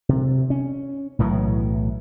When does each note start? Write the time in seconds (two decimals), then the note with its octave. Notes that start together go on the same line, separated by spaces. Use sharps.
0.09 C3
0.50 C#4
1.19 B1 A2 E3 F#3